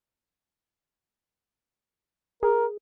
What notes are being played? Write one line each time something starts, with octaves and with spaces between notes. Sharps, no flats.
G#4 A#4